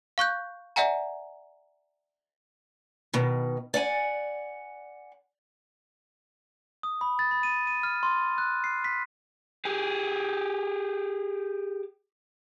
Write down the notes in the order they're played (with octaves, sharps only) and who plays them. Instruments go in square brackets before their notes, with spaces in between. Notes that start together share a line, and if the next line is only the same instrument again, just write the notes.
[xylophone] F5 C#6 F#6 G6
D5 E5 F#5 G#5 A#5
[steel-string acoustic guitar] B2 D#3
D5 F#5 G#5
[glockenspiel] D#6
B5
A6
B5
D#7
D#7
F6
C6
F#6
C7
B6
[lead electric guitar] G4 G#4